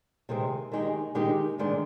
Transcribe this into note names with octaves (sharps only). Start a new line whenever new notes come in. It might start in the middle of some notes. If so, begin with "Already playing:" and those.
C3 D#3 G#3 C4
D#3 G#3 D#4 G4
D#3 G#3 D#4 G4
G#2 D#3 G#3 D4